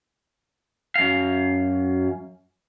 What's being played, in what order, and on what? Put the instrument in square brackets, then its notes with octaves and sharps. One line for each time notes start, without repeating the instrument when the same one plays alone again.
[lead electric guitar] F#2 F5